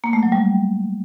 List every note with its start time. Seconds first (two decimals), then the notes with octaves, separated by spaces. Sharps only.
0.04 A#3
0.13 A3
0.23 F#3
0.32 G3